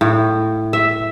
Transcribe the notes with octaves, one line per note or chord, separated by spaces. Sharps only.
A2
E5